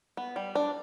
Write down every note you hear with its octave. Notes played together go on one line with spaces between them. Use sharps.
B3
G3
D4